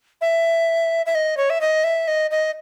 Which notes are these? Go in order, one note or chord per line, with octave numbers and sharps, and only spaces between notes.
E5
E5
D#5
C#5
E5
D#5
E5
D#5
D#5